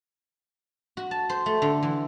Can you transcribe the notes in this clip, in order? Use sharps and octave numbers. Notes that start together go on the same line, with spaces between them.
F#4
A5
C5
A3
D3
E3